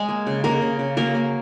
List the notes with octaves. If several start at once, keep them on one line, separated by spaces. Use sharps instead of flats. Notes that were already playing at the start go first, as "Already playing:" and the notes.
Already playing: G#3 G#4
A#3
C#3
C#3 A#3 A#4
C#3
C#3
F#3 A#3 A#4
A#3